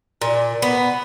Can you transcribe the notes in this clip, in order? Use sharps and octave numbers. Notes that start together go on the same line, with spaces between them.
A#2
B3